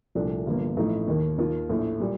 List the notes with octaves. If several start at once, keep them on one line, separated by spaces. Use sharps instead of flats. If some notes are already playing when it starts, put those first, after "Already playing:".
C2 A#2 F3 A3 D4
G1 G2 F3 A#3
A1 A2 F3 A3 D#4
D#2 D#3 A#3
D#2 D#3 A#3 F4
A#1 A2 A3
A#2 G3